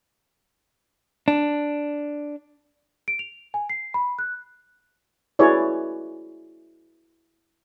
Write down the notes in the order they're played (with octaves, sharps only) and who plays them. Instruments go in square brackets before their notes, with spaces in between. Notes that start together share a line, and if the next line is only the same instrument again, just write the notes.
[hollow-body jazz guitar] D4
[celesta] D7
F7
G#5
C7
B5
F#6
[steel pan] E4 F#4 G#4 B4 C#5 D5